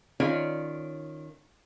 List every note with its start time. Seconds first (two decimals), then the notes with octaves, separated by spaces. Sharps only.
0.20 D#3 C#4 F4 C#5 D5